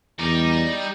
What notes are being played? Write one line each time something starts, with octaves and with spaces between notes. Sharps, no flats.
E2 G3 D#4 D5